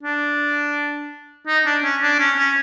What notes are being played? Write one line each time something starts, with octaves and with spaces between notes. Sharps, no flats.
D4
D#4
D4
C#4
D4
C#4
C#4